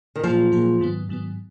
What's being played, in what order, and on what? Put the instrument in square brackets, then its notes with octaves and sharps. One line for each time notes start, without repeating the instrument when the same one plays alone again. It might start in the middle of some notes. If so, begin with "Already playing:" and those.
[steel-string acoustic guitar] D#3
[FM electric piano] A#2 F#3 A#3 F4 G#4 [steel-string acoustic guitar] F3
[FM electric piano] A#2 F#3 A#3 F4 G#4
G#2 D#3 F#3 B3
G#2 D#3 F#3 B3